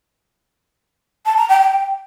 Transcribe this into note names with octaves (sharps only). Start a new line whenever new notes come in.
A5
A#5
G5
G5